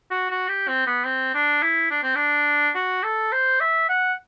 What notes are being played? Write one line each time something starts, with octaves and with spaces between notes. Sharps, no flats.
F#4
F#4
G4
C4
B3
C4
D4
E4
D4
C4
D4
F#4
A4
C5
E5
F#5